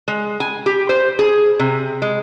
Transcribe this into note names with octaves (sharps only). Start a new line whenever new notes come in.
G#3
G#5
G4
C5
G#4
C3
G#3